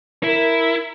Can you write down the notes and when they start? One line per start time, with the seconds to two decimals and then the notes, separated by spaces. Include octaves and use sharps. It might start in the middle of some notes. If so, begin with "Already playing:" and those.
0.24 E4 A#4